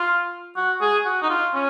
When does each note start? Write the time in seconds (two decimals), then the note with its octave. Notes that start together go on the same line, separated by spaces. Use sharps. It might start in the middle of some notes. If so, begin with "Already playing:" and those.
Already playing: F4
0.56 F#4
0.81 G#4
1.05 F#4
1.22 D#4
1.30 F4
1.54 C#4